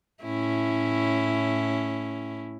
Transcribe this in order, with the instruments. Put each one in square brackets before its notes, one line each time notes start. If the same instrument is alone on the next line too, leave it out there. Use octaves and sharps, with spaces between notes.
[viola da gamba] A2 C#4 E4